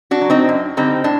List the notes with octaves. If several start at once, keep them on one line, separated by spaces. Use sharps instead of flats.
D4 F#4
F#3
C4 D#4
F#2
D3 G3 C4 D#4
A2 D4